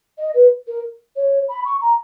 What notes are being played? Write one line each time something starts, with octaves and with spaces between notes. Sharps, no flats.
D#5
B4
A#4
C#5
B5
C#6
A#5